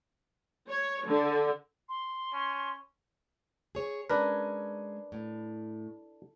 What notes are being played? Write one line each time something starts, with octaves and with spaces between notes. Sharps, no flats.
C#5
D3
C6
C#4
G#4 C#5
G#3 C#4 D4 A#4 B4
A2